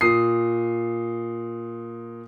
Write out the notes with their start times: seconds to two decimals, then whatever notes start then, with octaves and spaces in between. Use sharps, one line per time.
0.01 A#2 D#6 C7